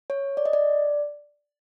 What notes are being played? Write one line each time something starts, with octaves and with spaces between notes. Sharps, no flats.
C#5
D5
D#5
D5